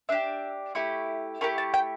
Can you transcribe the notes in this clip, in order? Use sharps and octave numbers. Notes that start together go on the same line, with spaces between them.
D4 G4 E5
A3 E4 G4
A3 E4 G4 A#4
A5
G5